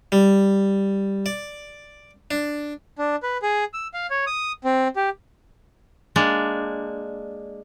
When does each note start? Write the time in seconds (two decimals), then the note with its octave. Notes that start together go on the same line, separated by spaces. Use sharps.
0.12 G3
1.26 D5
2.31 D4
2.99 D4
3.23 B4
3.42 G#4
3.74 E6
3.94 F5
4.10 C#5
4.27 D#6
4.64 C4
4.96 G4
6.16 G#3 A#3 D4